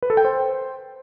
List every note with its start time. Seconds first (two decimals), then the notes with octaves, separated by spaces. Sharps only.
0.03 B4
0.10 A4
0.17 G5
0.25 C5